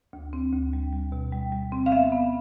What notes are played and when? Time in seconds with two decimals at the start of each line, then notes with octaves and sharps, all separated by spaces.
0.13 D2
0.33 C4
0.53 D2
0.73 G3
0.93 G3
1.12 B2
1.32 G3
1.52 G3
1.72 C4
1.86 F5
1.92 B3 E5
2.12 B3